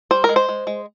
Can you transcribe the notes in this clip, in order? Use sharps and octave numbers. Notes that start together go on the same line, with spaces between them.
G3 C5
A#4
G#3
C5
G#3
G#3